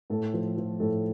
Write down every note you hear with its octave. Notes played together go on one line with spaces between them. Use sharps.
A2 A4
F3
F3
A2 A4